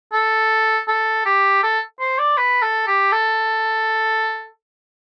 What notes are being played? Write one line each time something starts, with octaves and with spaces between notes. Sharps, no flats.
A4
A4
G4
A4
C5
D5
B4
A4
G4
A4